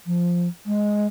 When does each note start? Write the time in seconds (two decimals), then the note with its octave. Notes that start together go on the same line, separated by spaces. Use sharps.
0.06 F3
0.66 G#3